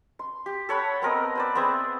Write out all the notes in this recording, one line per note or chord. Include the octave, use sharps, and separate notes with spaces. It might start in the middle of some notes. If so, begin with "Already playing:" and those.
C6
G4
A4 C#5 F#5 B5
B3 C4 A#4 D#5
B4 C5 D5
B3 C4 G#4 E5